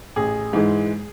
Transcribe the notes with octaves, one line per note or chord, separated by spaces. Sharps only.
A1 G#4
G#2 E3 G#3